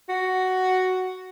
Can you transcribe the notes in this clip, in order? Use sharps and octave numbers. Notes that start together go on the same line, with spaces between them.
F#4